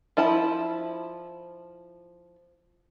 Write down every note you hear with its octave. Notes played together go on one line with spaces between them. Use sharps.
F3 E4 A5 B5